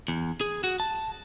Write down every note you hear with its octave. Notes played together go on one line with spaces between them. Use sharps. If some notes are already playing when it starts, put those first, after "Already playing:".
E2
G#4
F#4
A5